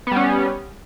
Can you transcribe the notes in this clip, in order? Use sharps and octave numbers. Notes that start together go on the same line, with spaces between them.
G3 B3 C#4